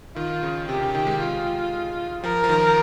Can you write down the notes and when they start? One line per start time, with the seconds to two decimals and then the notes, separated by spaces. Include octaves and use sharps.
0.16 D#3 F4
0.43 C#3
0.68 C3 G4
0.82 C#3
0.95 D#3
1.07 G#3
1.20 F4
2.24 F3 A#4
2.44 F3
2.49 D#3